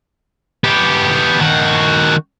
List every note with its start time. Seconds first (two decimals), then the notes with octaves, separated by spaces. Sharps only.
0.64 B3 G4
1.40 D#3 F#4